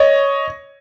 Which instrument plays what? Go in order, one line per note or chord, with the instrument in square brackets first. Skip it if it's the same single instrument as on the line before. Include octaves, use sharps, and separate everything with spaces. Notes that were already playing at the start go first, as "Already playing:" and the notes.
Already playing: [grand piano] C#5 D#5